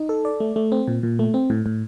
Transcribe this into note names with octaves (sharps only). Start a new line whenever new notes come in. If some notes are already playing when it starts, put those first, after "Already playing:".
Already playing: D#4
A4
D5
A3
A3
C4
A#2
A#2
A3
C4
A2
A2